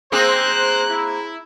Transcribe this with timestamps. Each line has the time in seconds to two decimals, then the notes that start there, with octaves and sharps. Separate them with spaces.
0.12 A#3 C4 G#4 C5 F#6
0.89 E4